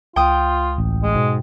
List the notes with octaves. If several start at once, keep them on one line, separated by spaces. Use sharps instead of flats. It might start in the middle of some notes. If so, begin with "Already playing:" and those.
C#2 F4 G5 D#6
A1
G#3
G#2 B2